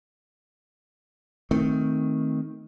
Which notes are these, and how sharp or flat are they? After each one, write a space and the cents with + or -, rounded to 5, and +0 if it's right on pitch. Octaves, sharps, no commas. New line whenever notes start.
D#3 +10 A3 +0 C4 +0